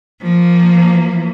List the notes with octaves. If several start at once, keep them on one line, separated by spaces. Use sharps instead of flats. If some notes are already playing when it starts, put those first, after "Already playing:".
F3 A#3